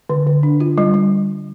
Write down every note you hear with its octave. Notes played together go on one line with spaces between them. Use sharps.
D3
D3
D4
F4
G3
G3